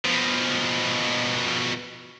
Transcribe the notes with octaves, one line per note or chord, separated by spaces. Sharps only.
B2 F3